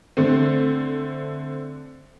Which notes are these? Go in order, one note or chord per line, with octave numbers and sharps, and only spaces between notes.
D3 A3 C4